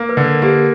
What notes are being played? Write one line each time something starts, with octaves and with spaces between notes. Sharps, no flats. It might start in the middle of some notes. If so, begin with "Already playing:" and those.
Already playing: A#3
B4
D3
A#4
A#3 G4